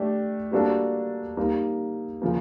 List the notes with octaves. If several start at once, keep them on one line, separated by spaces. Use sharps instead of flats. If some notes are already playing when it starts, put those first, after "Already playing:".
Already playing: A3 D4 G4
G3 A#3 D4 F#4 A4
G3 A#3 D#4
C#3 F3 A#3